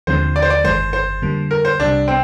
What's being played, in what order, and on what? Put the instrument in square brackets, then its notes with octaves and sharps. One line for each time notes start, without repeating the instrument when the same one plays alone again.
[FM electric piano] D#2 D3 F3 G#3 C4 [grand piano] C5
[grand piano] D5
C5
D5
[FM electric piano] G1 F2 D#3 G#3 [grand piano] C5
[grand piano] C5
[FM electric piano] F2 D3 G3 A#3
[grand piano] A#4
C5
[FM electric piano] C2 C3 G3 [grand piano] D4
[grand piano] C4